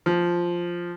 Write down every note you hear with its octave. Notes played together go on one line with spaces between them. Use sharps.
F3